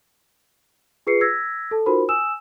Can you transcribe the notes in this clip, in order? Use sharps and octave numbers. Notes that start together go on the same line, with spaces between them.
F4 G#4 B4 C7 C#7
E6 G#6 A#6 B6
A4 A5
D#4 F4 F#4 A#4 C5 B5
G#5 D#6 E6 E7